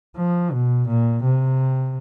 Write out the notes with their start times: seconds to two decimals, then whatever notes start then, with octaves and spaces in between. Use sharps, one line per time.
0.16 F3
0.52 B2
0.88 A#2
1.24 C3